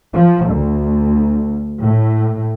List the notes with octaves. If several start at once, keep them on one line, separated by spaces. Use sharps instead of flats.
F3
D2
A2